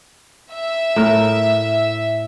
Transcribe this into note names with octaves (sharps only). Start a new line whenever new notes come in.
E5
A2 A#4